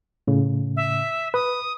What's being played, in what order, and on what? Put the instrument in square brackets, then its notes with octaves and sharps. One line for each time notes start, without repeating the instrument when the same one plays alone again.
[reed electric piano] A2 C#3
[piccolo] E5
[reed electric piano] B4 [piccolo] D#6